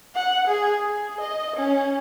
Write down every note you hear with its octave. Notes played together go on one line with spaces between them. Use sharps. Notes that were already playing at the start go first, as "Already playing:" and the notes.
F#5
G#4
G#4
D#5
C#4